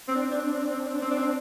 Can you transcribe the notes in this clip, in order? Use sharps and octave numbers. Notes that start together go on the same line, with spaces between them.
C4
D4
C4
D4
C4
D4
C4
D4
C4
D4
C4
D4
C4
D4
C4